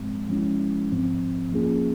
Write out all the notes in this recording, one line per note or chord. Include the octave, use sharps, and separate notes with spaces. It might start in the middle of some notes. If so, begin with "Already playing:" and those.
Already playing: G#2 F3 G#3 C4
F3 G#3 C#4 E4
G#2 F3 C4
F3 A#3 C#4 F4 G#4